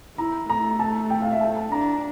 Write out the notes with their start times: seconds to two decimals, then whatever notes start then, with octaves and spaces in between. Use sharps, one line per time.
0.18 E4 A#5
0.50 A3 A#5
0.79 A5
1.10 G5
1.22 F5
1.31 E5
1.41 A3 A5
1.57 A5
1.72 D4 A#5